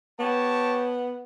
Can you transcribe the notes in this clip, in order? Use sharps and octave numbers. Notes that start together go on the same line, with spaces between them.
B3 G4 C#5 A5